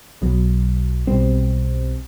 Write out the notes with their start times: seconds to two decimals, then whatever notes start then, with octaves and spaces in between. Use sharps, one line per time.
0.21 B1 B2 F#3
1.07 B1 B2 G3 C4